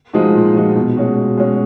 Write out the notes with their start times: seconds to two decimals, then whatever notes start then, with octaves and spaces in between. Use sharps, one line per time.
0.13 F3 G#3 D#4 F#4
0.35 A#2
0.56 F3 G#3 D#4 F#4
0.75 B2
0.97 G#3 C#4 F#4
1.18 B2
1.38 G#3 C#4 F#4